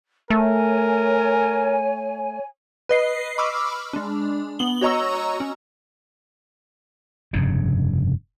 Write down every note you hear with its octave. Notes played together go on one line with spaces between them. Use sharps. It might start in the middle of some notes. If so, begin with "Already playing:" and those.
A3 A#4 C#5 G#5
B4 D#5 C7
B5 C#6 D6 E6 F6
G#3 D4
B3 F#7 G7
F#4 C#5 D#5 A#5 C#6 E6
C#4
F1 G2 C#3